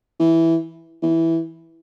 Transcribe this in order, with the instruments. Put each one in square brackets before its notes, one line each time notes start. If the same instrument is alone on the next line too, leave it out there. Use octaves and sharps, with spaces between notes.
[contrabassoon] E3
E3